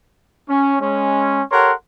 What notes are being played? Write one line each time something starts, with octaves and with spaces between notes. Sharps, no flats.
C#4
G#3 C#4
G4 A4 A#4 C#5 F#5 C6